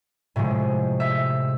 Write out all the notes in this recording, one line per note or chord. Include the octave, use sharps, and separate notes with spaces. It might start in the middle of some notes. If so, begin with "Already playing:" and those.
A2 C3 F3 G#3
E5